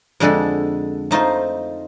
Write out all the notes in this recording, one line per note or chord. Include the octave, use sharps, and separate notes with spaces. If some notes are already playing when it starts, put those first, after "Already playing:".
F2 D3 G#3 A4 C6
A3 D#4 F4 C5